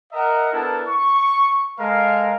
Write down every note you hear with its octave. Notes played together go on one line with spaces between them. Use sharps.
A#4 D#5 E5 F#5 A#5
B3 D4 E4 A4 A#4
C#6
G#3 A4 A#4 F5